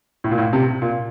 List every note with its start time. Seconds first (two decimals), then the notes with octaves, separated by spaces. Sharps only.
0.24 A2
0.31 A#2
0.38 A2
0.53 C3
0.82 A#2